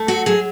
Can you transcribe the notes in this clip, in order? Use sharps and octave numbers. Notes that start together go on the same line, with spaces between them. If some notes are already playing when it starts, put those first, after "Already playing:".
Already playing: A3
F#3 F#4
F#3 G#4